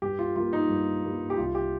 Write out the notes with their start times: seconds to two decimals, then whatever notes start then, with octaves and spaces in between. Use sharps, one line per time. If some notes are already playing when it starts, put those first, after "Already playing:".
0.02 G2 G4
0.19 F4
0.36 G3 A#3 F4
0.53 D#4
0.69 G2
1.04 G3 A#3
1.30 G4
1.37 C2 F4
1.55 G4